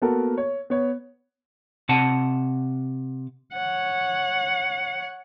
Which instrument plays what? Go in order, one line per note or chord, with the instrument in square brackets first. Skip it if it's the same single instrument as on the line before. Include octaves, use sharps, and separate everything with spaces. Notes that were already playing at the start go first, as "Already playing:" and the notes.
[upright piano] A#3 B3 F#4 A4 A#4
C#5
B3 C#5
[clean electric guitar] C3 F#5 A5
[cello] C#5 F#5